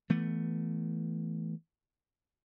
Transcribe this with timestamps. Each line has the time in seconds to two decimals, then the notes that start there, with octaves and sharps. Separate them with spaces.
0.10 E3 A3 B3